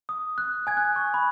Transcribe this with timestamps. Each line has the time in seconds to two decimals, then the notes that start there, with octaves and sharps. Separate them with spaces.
0.09 D#6
0.38 F#6
0.67 G#5 G#6
0.77 F#6
0.96 C#6
1.14 B5